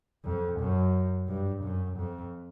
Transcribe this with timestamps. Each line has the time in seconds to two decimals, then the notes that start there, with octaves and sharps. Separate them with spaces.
0.24 F2
0.59 F#2
1.28 G2
1.63 F#2
1.98 F2